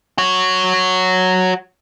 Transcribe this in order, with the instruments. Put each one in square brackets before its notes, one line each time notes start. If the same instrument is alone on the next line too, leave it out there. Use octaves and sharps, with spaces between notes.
[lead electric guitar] F#4 C#5